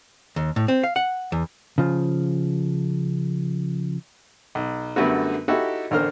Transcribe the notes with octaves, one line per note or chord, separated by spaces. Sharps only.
D#2
A2
C4
F5
F#5
E2
C#3 F3
B1
F#2 D3 G3 A3 B3 F#4
D#4 E4 F#4 G4 A4
A1 D3 A#4 C5 F6